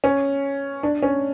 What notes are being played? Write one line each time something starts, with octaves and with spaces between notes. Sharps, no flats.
C#4
D4
C#4